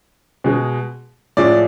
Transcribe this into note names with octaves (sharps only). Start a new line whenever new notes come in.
B2 G#3
A2 F3 G#3 D5